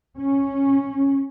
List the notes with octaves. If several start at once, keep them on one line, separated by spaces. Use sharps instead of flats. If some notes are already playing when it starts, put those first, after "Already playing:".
C#4